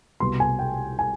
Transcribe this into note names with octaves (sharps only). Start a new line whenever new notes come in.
C2 B2 B3 C6
G#5
G5
G#5